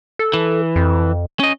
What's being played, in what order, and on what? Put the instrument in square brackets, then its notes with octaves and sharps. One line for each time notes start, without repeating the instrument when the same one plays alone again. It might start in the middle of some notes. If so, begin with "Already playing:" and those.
[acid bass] A4
[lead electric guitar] E3
[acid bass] F2
[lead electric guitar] C#4 D#5